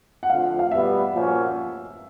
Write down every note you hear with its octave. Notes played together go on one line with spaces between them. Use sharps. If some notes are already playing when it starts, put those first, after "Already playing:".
F#5
F2 D3 F3 A3 F5
F5
B2 G3 B3 E5
A#2 F3 A#3 C#4 F#4